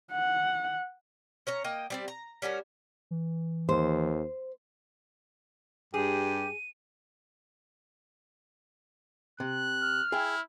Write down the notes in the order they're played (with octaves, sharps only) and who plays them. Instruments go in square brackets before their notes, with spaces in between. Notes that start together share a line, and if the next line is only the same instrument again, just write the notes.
[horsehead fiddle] F#5
[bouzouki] C#4 C#5 A#5
A#3 D#5 G5
G3 C4 D5
A#5
G3 C#4 F#4 A#4
[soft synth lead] E3
[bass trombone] D#2 [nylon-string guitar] C5
[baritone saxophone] G2 [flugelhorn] G4 [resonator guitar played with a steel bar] G#4 [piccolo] D#7
[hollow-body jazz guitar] C3 [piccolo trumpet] F#6
[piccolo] F6
[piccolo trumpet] E4 [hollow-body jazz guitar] G#4 G5